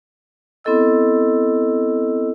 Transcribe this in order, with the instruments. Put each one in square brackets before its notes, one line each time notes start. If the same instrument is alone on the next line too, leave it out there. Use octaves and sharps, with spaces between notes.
[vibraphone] B3 C4 E4 A4 D#5 E6